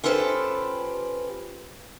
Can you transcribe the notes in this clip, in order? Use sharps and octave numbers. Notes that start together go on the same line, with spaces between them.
C#4 F4 G4 A4 B4 C5